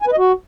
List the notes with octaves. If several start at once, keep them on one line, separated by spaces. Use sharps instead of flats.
G#5
B4
D#5
F#4